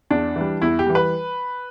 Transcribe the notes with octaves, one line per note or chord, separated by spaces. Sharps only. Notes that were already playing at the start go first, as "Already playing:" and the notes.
E2 D4
E3
G3
E2 E4
G4
E3 G3
B4